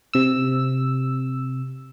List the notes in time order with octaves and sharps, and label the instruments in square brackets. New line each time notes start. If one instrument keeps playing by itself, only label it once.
[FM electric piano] C3 E6